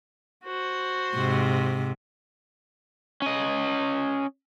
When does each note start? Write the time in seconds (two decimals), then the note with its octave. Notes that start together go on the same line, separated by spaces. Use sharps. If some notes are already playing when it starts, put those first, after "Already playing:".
0.45 F#4 C5
1.15 G#2 C3
3.22 C#4 D#5